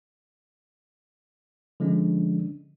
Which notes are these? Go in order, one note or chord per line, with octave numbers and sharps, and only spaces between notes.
D3 F3 G#3 C#4 D4